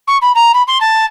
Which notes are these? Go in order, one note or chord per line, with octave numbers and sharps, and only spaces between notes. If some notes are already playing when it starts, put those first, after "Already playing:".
C#6
B5
A#5
B5
C6
A5